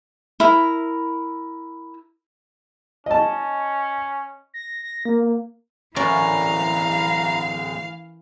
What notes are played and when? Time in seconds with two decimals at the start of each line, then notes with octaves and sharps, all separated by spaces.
0.40 E4 A#4
3.06 C#4 D#5 A5
4.54 A#6
4.83 A#6
5.06 A#3
5.22 A#3
5.96 D2 A2 E3 C#4 A#4 D5 F5 A#5